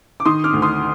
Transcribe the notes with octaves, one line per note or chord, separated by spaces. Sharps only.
D6
D#3 C6 D#6
D6 F6
D2
C6 D#6